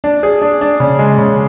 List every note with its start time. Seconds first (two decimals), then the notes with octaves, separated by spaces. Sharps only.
0.04 D4
0.23 G#4
0.42 D4
0.61 D4
0.80 C#3
0.99 G#3
1.18 C#3